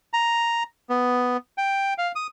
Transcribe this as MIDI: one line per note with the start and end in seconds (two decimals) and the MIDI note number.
0.13 0.63 82
0.90 1.37 59
1.58 1.94 79
1.98 2.12 77
2.15 2.27 87